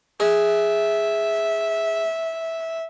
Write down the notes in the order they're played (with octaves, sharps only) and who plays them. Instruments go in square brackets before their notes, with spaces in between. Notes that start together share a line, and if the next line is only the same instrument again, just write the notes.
[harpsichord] G#4 [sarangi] E5